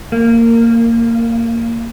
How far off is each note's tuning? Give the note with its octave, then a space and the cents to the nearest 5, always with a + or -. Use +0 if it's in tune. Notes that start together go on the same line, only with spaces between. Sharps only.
A#3 -15